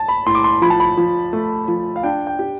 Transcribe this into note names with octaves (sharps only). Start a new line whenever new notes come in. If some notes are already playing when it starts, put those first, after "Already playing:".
Already playing: A5
B5
A2 C6
D6
C6
F3 B5
A5
B5
F3
A3
F3
F5
D4 G5
G5
G4